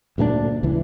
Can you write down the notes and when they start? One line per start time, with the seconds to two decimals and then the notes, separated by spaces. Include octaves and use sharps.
0.18 D2 A#2 A3 D4
0.63 C#2 E3